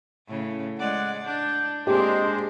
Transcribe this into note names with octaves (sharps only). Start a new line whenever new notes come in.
A2 C#3
G#3 D5 F#5
D4 G6
G#3 A#3 C4 D4 G4 C5